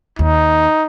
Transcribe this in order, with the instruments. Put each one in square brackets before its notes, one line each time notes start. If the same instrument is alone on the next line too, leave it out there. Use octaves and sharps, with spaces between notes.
[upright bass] D#2 [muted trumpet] D#4